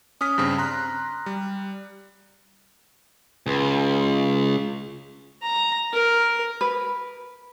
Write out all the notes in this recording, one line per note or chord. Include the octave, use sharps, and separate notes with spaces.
C#4 D#6 F6 B6
G2 C#3 C4
A#5 C6 F#6
G3
C#2
A#5
A#4
B4